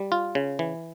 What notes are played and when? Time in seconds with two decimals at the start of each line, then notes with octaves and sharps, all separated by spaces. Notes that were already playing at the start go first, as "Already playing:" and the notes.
Already playing: G3
0.12 F4
0.35 C#3
0.59 E3